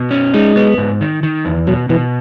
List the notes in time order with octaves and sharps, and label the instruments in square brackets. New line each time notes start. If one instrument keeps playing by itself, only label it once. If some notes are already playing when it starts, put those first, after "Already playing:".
Already playing: [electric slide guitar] B2
C#4
[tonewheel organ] G#3 [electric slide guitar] D#4
[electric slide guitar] B3
G#2
D#3
D#3
E2
[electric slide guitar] B2 [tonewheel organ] F#3
[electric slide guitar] B2 [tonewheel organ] E3